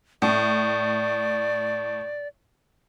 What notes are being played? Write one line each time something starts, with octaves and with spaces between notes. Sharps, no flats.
A2 D5